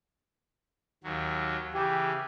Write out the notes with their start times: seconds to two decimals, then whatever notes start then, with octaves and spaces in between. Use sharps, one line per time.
1.04 D#2 F#3
1.74 C#3 E3 G4